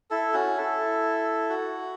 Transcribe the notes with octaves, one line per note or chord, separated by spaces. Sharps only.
E4 A4
C#4 F#4
E4 A4
F#4